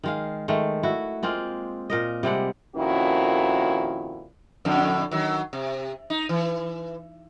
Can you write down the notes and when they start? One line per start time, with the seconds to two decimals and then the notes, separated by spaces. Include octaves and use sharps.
0.03 D#3 G#3 F5
0.48 D#3 G#3 A3
0.83 E4 F#4
1.23 G#3 A#3 C4 F4
1.90 A#2 A#4 D#5
2.23 C3 G3 G#3 F#5
2.76 F2 A#2 D#3 C#4 E4 F#4
4.65 F2 A2 D3
5.11 D#3 F#3
5.53 C3
6.10 D#4
6.29 E3